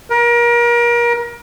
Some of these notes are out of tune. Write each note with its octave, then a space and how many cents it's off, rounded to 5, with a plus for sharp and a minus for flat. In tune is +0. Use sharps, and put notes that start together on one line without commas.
A#4 +30